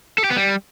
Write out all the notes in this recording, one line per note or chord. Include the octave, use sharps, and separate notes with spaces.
A4
G4
B3
G3